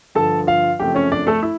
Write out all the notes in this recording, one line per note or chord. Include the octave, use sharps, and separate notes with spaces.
G2 D3 F3 A4 A5
F4 F5
F#2 C#3 F3 A3 C4 G4 G5
C#4 C#5
D4 D5
A3 A4
E4